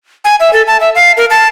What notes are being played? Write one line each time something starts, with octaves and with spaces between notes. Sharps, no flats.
G#5
E5
A4
A5
E5
F5
A#4
A5